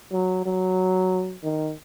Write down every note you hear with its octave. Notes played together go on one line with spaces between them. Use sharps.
F#3
F#3
D#3